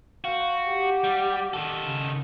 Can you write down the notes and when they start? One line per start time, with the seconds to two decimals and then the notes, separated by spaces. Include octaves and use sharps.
0.24 F#4 F5 G5 C6
0.69 G4 F#5
1.04 G3
1.54 D#3 A4
1.86 C#3